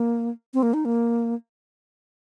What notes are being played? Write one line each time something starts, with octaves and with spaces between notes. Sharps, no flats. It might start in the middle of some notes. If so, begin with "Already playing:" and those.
Already playing: A#3
C4
A#3
D#4
A#3